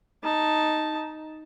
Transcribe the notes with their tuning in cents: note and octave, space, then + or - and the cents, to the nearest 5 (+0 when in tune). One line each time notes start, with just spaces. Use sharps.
D#4 +0 A5 +0